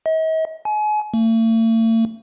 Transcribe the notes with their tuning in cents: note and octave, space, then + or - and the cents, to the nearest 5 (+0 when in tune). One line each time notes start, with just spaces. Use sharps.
D#5 +45
G#5 +35
A3 +45